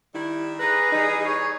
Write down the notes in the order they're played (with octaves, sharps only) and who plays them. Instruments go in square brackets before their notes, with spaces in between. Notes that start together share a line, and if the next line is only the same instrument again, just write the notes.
[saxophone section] D#3 G3 E4
[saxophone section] E3 B4 [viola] G#4 [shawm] A#5
[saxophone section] E3 G3 D#4
[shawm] C#5